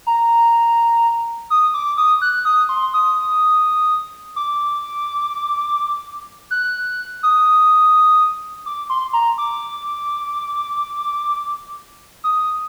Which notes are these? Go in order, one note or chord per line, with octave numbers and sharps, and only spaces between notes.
A#5
D#6
D6
D#6
F#6
D#6
C6
D#6
D6
F#6
D#6
D6
C6
A#5
D6
D#6